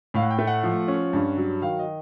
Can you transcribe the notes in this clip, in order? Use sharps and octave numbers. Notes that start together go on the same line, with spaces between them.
A2 F5
F#5
G5
A3
F#5
F3
C#4
G2
F#3
D#3 F5
D#5